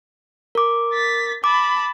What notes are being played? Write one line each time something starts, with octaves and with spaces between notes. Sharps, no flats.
A#4 D6
A6 B6
A5 B5 D6